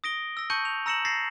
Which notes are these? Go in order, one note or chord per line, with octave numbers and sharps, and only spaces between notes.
D#6 A#6 D7 G7
E6 A#6
A5 C#6 G6 C#7 D#7 F#7
F7
A#5 E6 A#6 C#7 E7 F#7
A6 A#6 C7